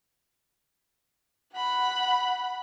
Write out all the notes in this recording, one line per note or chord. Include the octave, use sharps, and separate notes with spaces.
F#5 B5